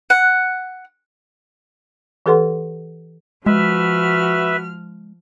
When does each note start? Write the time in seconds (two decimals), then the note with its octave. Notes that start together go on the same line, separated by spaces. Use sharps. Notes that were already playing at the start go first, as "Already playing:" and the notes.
0.10 F#5
2.26 E3 G4 A4 B4 F#5 C6
3.46 F3 G#3 F#4 B4 E5 F6